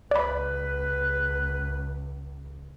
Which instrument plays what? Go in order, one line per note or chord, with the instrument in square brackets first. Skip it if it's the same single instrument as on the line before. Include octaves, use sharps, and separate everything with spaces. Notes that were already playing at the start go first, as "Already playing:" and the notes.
[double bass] C#2 [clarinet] B4 [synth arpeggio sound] D5 B5